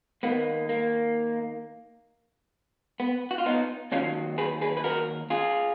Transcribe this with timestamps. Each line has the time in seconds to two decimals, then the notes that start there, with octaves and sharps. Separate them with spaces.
0.23 D#2 D#3 A#3 B3
0.69 A#3
3.00 B3
3.31 F#4
3.38 F4
3.46 B3 D#4
3.92 D#2 D#3 F#3 C#4 F4
4.38 G#4 B4
4.61 G#4 B4
4.77 B4
4.84 F#4 A#4
5.30 F4 G#4